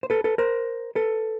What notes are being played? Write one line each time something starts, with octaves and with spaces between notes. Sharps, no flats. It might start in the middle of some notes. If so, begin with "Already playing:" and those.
C5
A4 B4
A4 B4
A#4 C5
A4 B4